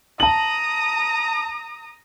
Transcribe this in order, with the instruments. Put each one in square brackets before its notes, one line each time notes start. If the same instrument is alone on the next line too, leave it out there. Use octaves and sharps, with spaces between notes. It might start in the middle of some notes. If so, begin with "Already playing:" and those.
[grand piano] A5 F#7 [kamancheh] A#5 D#6